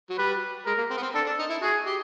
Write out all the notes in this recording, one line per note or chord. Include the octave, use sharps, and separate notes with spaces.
F#3
G3 B4
G#3 A#4
A#3
C4
B3
C4
D4 A4
D4
D#4
E4
F#4 G#4
G4